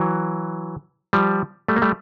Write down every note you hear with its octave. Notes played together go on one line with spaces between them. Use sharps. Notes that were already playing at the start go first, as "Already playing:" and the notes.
Already playing: E3 F#3
F3 G3
G3 A3
A#3
G3 A3